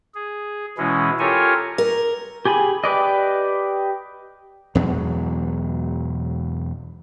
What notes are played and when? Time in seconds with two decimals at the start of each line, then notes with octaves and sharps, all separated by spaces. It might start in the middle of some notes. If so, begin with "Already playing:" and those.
0.15 G#4
0.78 B2 E3 G#3 C#4 E4
1.19 F4 G4 A4 A#4 C#5 G#5
1.78 A#4
2.45 G4 G#4 G#5 B5
2.84 G4 B4 D5 D#5
4.75 E2 B2 F#3 G#3